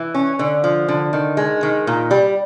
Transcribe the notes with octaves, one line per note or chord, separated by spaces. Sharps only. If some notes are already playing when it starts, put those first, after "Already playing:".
Already playing: E3
C#4
D3
F3
D3
D#3
G#3
D#3
A#2
G3